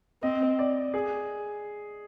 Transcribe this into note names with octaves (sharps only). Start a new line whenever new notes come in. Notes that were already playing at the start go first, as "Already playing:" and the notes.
C4 D#5
D5
G#4